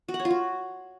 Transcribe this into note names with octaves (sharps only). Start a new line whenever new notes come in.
F#4
F#5
C#5
F4
F#4